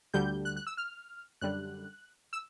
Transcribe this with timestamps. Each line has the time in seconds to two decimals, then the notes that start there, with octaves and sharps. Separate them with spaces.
0.14 D2 D3 G3 G6
0.45 F#6
0.56 F#6
0.67 E6
0.77 F6
1.41 F#2 D3 G3 F#6
2.33 E6